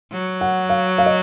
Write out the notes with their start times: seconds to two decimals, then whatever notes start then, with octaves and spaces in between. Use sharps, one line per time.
0.13 F#3
0.41 F#5
0.70 F5
0.98 F5
1.06 D#5